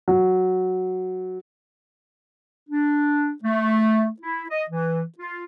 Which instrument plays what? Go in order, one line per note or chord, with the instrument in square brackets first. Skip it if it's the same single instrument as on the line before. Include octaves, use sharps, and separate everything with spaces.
[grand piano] F#3
[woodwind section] D4
A3
E4
D#5
E3
F4